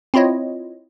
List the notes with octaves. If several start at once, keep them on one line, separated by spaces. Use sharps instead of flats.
C4 E4 F4 C#5 D#5